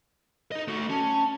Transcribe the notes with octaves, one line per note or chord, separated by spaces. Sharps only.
D#4 D#5
A3 F#4
C#4 A5